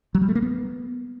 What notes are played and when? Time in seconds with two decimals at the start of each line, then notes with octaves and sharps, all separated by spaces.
0.15 F#3
0.21 G3
0.28 A3
0.35 A#3
0.42 B3